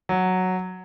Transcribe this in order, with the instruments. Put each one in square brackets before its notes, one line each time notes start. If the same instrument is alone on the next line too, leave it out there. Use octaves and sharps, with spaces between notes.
[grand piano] F#3